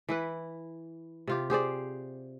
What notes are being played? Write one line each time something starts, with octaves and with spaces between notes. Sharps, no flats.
E3 E4 B4
C3 F4 G4
G4 G#4 C5 D5